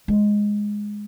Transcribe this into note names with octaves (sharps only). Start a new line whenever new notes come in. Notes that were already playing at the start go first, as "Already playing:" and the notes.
G#3